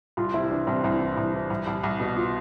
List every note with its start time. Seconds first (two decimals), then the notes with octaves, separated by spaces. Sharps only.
0.17 C2 F4
0.34 C3 E4
0.50 E3 D4
0.67 C2 C4
0.84 C2 E4
1.01 E3
1.17 C2
1.34 E3
1.50 C2
1.67 C2
1.84 C2
2.00 B2
2.16 F4